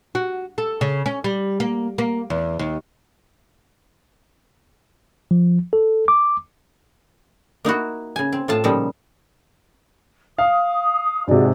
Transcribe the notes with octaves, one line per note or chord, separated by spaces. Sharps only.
F#4
A4
C#3
C#4
G3
A#3
A#3
E2
D#2
F3
A4
D6
A#3 D#4 E4 F#4
C#3 G#5
C4
A2 F4 A5
A#2 C#3 F3 G3 D#4
F5 D#6
G#2 C3 F#4 G#4 D5